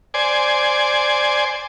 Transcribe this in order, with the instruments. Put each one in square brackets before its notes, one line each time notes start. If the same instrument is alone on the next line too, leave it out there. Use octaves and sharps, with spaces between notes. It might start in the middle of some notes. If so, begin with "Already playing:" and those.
[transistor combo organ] C5 D5 G#5